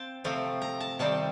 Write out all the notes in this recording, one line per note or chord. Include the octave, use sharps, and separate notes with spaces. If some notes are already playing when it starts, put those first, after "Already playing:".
Already playing: C4 F5 G5 A5
C3 F3 A3 C4
A#5
A5
C3 D#3 G3 C4 A5